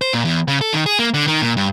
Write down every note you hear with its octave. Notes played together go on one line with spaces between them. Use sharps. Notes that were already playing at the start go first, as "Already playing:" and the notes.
C5
A#2
E2
C#3
A4
D#3
G#4
A#3
D3
D#3
A#2
G2